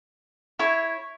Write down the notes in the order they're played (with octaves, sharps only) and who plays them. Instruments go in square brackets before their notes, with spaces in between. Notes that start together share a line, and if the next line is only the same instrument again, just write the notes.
[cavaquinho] E4 C#5